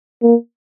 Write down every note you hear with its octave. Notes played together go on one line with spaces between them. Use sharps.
A#3